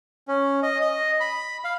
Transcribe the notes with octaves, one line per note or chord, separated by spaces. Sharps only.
C#4
D#5
D#5
B5
F5